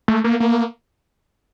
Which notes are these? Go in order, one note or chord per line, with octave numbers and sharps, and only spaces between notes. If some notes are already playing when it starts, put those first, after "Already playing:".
A3
A#3
A#3